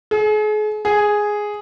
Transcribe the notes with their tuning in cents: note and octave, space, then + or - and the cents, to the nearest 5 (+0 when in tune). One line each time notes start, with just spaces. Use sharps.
G#4 +40
G#4 +0